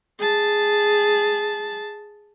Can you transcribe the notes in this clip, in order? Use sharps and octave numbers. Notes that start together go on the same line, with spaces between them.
G#4 A5